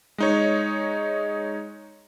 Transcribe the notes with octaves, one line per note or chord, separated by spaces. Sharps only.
G#3 D#4 C#5